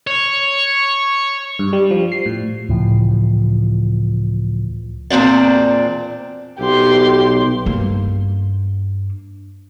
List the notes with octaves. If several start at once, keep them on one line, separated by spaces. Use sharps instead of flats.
C#5
G2
G3
F3
C7
A2
C#2 A2 E3 F3
E2 A#2 C4 D4 D5
B1 G4 C6
G2 A#3